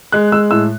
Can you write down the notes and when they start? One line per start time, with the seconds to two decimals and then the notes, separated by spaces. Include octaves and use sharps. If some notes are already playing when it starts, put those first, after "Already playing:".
0.12 G#3 F#6
0.32 G#3 E6
0.51 A2 E6